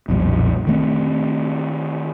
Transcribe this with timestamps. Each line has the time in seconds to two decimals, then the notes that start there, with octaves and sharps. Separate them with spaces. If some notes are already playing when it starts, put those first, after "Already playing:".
0.08 B1 F2 A#2 G3
0.67 D#3 A3 C4